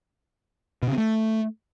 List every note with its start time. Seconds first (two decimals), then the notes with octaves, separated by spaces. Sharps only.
0.82 B2
0.88 C#3
0.93 C4
0.98 A3